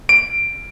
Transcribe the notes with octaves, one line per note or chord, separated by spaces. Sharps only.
D7